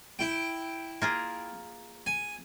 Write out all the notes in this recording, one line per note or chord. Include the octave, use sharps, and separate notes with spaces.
E4 G5
A#3 F4 G#4
G#5